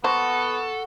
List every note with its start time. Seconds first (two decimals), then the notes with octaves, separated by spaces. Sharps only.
0.04 B3 F#4 A4 C5